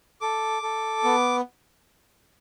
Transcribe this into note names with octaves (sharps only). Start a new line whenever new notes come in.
A4 D6
A4
B3